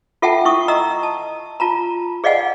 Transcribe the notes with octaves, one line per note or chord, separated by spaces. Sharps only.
F4 A4 E5 F#5 G5 A5
E4 C#6 D#6
D#5 A#5 E6
A5
F4 A5 A#5
G#4 D5 D#5 F5 F#5 G#5